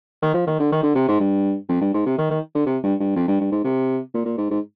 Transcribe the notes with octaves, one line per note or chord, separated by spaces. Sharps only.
D#3
F3
D#3
D3
D#3
D3
C3
G#2
G2
F2
G2
G#2
C3
D#3
D#3
D3
C3
G2
G2
F2
G2
G2
G#2
C3
A#2
A#2
G#2
G#2